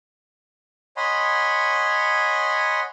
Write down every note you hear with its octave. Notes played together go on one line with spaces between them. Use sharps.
C#5 D#5 F#5 G#5 B5 C6